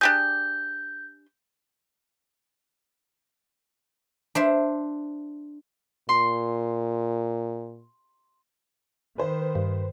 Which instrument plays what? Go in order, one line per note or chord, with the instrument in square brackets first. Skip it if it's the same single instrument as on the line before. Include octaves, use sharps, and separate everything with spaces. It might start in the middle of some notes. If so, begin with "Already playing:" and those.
[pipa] D4 G4 G#4 [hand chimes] G6
[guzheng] D4 C5 E5
[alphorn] A#2 [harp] C6
[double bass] D#3 [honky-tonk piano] B4 C5
[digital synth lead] G2